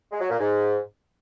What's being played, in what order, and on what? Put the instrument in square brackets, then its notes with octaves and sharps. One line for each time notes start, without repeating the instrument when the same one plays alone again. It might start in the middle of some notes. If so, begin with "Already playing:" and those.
[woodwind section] G#3
F#3
A#2
G#2